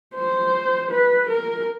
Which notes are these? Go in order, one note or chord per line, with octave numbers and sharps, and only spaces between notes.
C5
B4
A#4